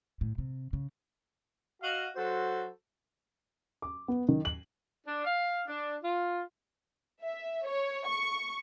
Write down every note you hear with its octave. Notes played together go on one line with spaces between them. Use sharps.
A2
C3
C#3
F#4 D#5 F5
F#3 F#4 A4 C5
D6
B3
D#3
F#7
D4
F5
D4
F4
E5
C#5
C#6